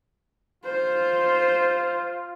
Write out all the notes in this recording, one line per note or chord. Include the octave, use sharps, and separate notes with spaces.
F4 C5